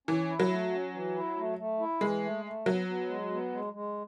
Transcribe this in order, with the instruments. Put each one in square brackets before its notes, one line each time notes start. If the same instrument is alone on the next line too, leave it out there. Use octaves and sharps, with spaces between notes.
[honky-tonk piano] E3 [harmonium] C#4
[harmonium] E4
[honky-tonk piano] F#3
[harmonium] A3
C#4
E3
E4
A3
A3
E4
[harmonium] E3 [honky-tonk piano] G#3
[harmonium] A3
A3
[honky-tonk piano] F#3 [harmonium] B3
[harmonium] B3
G#3
B3
G#3
G#3